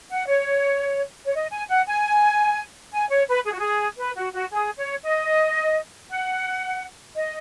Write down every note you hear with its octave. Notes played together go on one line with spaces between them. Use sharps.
F#5
C#5
C#5
D#5
G#5
F#5
G#5
G#5
C#5
B4
G#4
F#4
G#4
B4
F#4
F#4
G#4
C#5
D#5
F#5
D#5